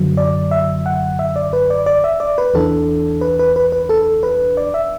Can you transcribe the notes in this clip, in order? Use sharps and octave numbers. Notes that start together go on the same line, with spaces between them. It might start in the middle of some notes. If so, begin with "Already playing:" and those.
Already playing: F#2 D3 F#3
D5
E5
F#5
E5
D5
B4
D5
D5
E5
D5
B4
E2 E3 D4 A4
B4
B4
B4
B4
A4
B4
D5
E5